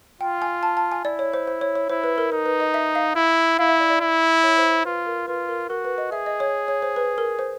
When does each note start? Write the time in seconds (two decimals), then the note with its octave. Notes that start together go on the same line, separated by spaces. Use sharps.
0.21 F4 G5
0.42 G#5
0.63 A5
0.77 A5
0.92 G#5
1.05 E4 D5
1.19 C#5
1.34 C5
1.47 C5
1.61 C#5
1.75 C#5
1.90 E4 C5
2.04 B4
2.18 A#4
2.32 D#4 A#4
2.46 B4
2.60 D#5
2.74 E5
2.95 F5
3.16 E4
3.59 E4 F5
3.69 E5
3.80 D5
3.90 D5
4.01 E4
4.43 C#5
4.57 C5
4.71 C5
4.85 F4 B4
5.07 A#4
5.28 F4 B4
5.49 A#4
5.70 F#4 A#4
5.85 B4
5.98 D#5
6.12 G#4 E5
6.26 D#5
6.40 C#5
6.68 C#5
6.83 C5
6.96 B4
7.18 A#4
7.39 C5